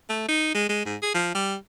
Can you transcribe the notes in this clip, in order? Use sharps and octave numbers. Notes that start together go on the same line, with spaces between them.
A3
D#4
G#3
G#3
G#2
G#4
F3
G3